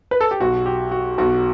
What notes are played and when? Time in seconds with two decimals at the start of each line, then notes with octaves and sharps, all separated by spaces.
0.11 B4
0.21 A4
0.31 G4
0.40 B1 B2 F#4
0.66 G4
0.91 F#4
1.18 B1 B2 F#4